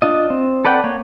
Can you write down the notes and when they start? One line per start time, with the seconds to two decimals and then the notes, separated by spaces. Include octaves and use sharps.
0.02 D4 F4 D#5
0.30 C4
0.65 A4 B4 D5 F#5 G5
0.84 A#3 C#5